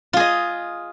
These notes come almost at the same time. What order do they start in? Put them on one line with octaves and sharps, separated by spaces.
F4 G#4 D#5